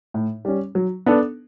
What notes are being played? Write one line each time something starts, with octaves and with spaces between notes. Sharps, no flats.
A2
G3 C#4
F#3
B3 D4 A4